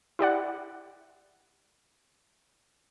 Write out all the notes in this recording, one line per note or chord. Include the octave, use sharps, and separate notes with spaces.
E4 G4 D5 F#5